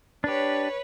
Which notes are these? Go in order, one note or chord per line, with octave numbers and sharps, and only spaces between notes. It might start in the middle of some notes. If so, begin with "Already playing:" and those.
D4 G4 B4 C#5